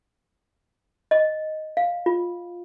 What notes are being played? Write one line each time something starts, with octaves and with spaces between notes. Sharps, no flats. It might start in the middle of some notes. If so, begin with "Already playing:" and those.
D#5
F5
F4